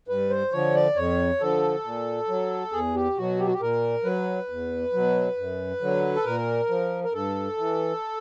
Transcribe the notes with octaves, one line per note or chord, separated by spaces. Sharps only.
G2 B4
C5
D3 F3 C#5
D5
F2 C#5
D3 F3 A4
A#2
F#3
E2 G#4
G4
B2 F#3 F#4
G4
F#4
G4
A#2 A#4
F#3 B4
E2
B2 F#3
F#2
D3 F#3
A4
A#2 A#4
F3
A#4
G2 A4
E3